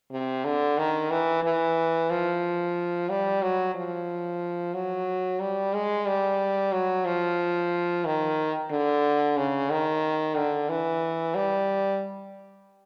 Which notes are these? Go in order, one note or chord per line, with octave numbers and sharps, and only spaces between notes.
C3
D3
D#3
E3
E3
F3
G3
F#3
F3
F#3
G3
G#3
G3
F#3
F3
D#3
D3
C#3
D#3
D3
E3
G3